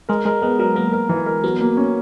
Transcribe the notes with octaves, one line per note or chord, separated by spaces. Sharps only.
G#3 A#4
G#3 A#4
G#3 B3
F#3 A#4
A#3 A#4
A#4
E3
A#4
F#3 B3
A#3
C#4